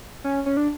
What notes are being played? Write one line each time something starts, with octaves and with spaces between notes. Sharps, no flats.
C#4
C#4
D4